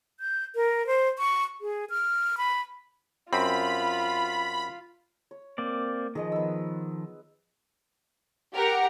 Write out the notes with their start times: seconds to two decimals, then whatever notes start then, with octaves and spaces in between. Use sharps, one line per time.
0.20 G6
0.55 A#4
0.87 C5
1.19 C#6
1.61 G#4
1.90 F6
2.38 B5
3.33 F#2 C4 F4 B5
5.31 C#5
5.58 A#3 C4 D5
6.15 D#3 F3 G#4 D#5 F#5
6.32 B3 E6
8.55 G4 A#4 F#5 A#5